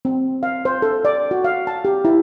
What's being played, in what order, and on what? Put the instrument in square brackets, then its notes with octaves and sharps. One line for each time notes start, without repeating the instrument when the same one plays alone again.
[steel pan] C4
F5
C5
A4
D5
F#4
F5
A5
G4
E4